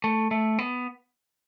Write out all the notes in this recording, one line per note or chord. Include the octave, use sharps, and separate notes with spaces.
A3
A3
B3